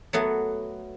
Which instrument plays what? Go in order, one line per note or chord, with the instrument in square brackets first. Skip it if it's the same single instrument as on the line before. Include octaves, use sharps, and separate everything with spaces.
[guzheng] F#3 A3 B3 F#4